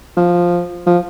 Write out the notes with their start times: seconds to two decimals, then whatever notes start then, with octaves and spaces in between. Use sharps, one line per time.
0.17 F3
0.86 F3